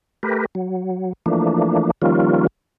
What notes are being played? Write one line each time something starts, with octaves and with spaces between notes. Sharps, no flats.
A3 G4 A#4 B4
F#3
E3 F3 A3 A#3 D4
D#3 F3 G3 A#3 C#4 F4